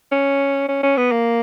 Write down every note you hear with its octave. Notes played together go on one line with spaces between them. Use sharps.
C#4
C#4
C#4
B3
A#3